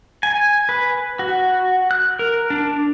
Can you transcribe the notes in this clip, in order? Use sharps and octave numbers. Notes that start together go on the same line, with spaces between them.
G#5
B4
F#4
F#6
A#4
D4